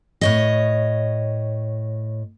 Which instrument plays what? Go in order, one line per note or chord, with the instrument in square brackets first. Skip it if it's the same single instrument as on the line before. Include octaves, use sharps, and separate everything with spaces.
[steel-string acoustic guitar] A2 C#5 D#5